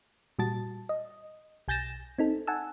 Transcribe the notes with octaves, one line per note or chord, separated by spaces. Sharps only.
A#2 G3 F#4 A5 A6
D#5
B1 G#5 G6 A6 A#6 E7
C4 D#4 A4
F#5 G#5 A5 E6